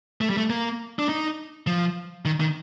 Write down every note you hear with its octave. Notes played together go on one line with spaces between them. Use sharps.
A3
G3
A3
A#3
D4
D#4
F3
D#3
D#3